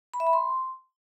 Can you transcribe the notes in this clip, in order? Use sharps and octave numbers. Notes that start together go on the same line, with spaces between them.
B5
E5
B5
C6